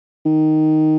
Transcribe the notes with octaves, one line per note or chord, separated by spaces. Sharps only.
D#3